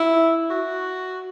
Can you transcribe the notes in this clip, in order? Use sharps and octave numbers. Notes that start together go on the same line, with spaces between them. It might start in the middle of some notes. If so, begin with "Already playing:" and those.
Already playing: E4
F#4